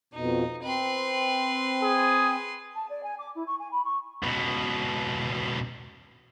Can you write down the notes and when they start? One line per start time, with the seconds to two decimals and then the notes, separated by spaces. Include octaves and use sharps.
0.14 F2 B2 D#4
0.63 C4 B4 C6
1.83 G#4
2.74 A5
2.89 D5
3.03 G#5
3.18 D6
3.35 E4
3.46 C#6
3.59 G#5
3.71 B5
3.84 C#6
4.23 C#2 B2